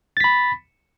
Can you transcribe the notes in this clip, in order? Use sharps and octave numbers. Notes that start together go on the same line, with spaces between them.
B5 A6 B6